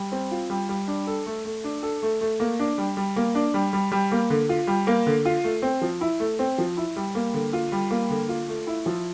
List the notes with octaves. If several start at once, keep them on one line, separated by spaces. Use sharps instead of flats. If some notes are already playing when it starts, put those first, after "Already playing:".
Already playing: G3
C4
F4
G3
G3
D4
A4
A3
A3
D4
A4
A3
A3
A#3
D4
G3
G3
A#3
D4
G3
G3
G3
A#3
D3
F4
G3
A#3
D3
F4
A3
C4
F3
E4
A3
C4
F3
E4
G3
A#3
D3
F4
G3
A#3
D3
F4
A3
E4
F3